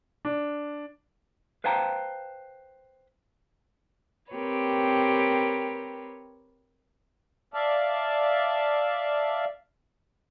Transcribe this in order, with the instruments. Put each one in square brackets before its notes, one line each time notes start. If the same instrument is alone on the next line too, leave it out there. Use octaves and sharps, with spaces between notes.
[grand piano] D4
[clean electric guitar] B4 C5 F5 G5 A5 A#5
[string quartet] C4 G4 A#4 B4 C#5
[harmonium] D5 E5 F5 A5